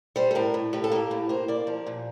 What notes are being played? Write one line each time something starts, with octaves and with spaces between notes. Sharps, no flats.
G3 C5
A4
A2 A#4
A2
A2 G4
A4
A#3 G4
A2
A#3 C5
A#3 D5
F3 A#4
A#2